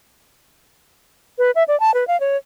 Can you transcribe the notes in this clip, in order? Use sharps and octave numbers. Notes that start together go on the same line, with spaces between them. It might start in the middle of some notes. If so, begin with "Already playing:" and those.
B4
E5
D5
A5
B4
F5
C#5